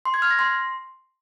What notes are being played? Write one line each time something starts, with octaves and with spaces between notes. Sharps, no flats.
C6
G#6
F6
A#6
C6